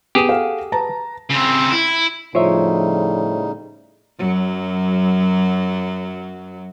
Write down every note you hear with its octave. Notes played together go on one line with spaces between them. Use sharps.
B3 G4 G#4 E7
A4 F5 F#5
B4 A5 A#5
C#3 C4
E4
A2 C#3 F3 G3 D#4 C5 C#5 E5
F#2 F#3